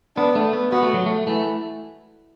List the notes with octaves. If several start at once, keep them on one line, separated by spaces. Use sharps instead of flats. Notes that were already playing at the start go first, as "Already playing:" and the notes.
B3 D4
A3
B3
B3 F#4
A3
F#3
A3
E3 A3